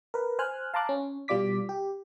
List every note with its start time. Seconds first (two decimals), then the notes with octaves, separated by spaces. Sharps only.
0.14 A#4 B4
0.39 C5 G#5 F6 F#6
0.74 F5 A5 A#5 C6 D6 F#6
0.89 C#4
1.28 B2 G3 F4 D5 D6 B6
1.69 G4